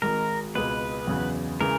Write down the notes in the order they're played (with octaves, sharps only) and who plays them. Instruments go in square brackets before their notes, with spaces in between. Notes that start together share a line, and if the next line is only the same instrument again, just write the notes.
[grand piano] G#1 G#2 D#3 G#3 [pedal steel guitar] A#4
[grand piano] C#2 B2 G#3 [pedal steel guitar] B4
[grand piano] E2 C#3 F#3 B3
[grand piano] C#3 E3 G#3 [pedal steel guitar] A#4